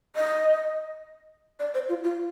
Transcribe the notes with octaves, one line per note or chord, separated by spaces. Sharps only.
D#5
D5
C5
F4
F4